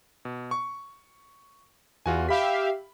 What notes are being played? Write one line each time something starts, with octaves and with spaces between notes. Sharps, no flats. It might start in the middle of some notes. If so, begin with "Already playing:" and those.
B2
C#6
E2 F4 F#4 G#5
G4 E5 F5 B5 B6